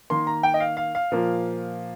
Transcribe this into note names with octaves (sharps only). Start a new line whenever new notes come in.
D#3 A#3 C6
A#5
G5
D#5
F5
F5
F5
A#2 F3 A#3